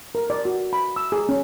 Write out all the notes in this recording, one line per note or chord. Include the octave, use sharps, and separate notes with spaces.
A#4
D5
F#4
B5
E6
G#4
C#4